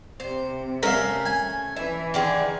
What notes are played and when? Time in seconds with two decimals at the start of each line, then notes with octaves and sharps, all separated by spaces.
0.20 C3 C5
0.83 A3 C#4 A#4 E5 F5
1.26 G#5
1.76 E3 E5
2.14 D3 D#3 G#4